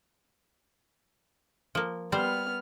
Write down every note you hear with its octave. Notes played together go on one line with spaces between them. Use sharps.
F3 A#3
G3 B3 C5 F6